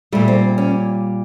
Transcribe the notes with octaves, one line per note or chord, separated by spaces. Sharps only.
A#2 G3 A3
C4
C#4